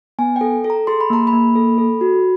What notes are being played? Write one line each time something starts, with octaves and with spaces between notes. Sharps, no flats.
B3 G#5
A4 G5
A4
A#5
G#4 C6
B5
A#3 A#5
B5
A#3
A4
A4
F#4